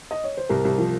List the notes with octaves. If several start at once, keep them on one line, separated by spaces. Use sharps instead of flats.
D#5
C#5
C5
C2 A#4
C2
F3